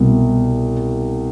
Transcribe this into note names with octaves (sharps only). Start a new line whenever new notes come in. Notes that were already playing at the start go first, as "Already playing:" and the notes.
Already playing: C2 B2